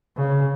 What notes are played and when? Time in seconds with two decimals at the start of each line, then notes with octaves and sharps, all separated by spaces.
0.16 C#3